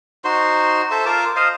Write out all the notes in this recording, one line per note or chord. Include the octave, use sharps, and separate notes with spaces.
D#4 F#4 C5 C6
A4 C5 E5
F4 A#4 A5 D6
C5 D#5 F5